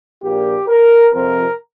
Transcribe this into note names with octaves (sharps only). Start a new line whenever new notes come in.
A#1 A#2 A#3 G4
A#4
F2 C3 F3 C4 A#4